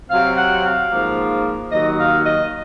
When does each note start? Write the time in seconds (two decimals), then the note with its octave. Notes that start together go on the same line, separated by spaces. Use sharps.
0.10 C3 F#3 C4 F5
0.37 F#5
0.64 F5
0.91 G#2 F3 A#3
1.72 D#2 D#3 F#3 D#5
1.99 F5
2.26 D#5